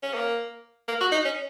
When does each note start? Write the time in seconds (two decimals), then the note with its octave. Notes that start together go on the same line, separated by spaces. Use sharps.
0.03 C#4
0.14 A#3
0.88 A#3
1.01 F#4
1.12 D#4
1.25 C#4